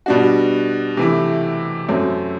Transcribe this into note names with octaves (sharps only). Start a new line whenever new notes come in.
B2 G3 D4 F#4
C3 E3 A3 E4
F#2 F#3 A3 C4